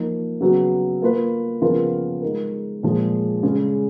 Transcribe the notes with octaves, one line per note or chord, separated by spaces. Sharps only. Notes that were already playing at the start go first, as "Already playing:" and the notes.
Already playing: F3 A#3 D#4
C#3 F#3 B3
A#3 F4 B4
C#3 F3 B3 F4 A#4
G#3 D#4 A#4
A#2 F3 G#3
C#3 G#3 C#4